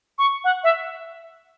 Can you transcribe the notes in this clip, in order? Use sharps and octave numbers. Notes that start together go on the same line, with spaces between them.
C#6
F#5
E5